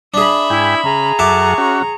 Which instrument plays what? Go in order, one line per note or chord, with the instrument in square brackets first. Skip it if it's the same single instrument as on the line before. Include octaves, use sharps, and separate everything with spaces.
[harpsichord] D4 G#4 [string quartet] E5 B5
[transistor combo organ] G#2 G5 G#5 [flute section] E4
[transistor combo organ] C#3 [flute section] G#4 A#5
[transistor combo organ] F#2 A4 F#5 [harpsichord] E5 A5 D6 [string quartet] C#6
[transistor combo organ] C#4 F#4